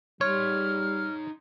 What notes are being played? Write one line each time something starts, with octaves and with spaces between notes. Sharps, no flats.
G3 D#4 C#5 C6 F6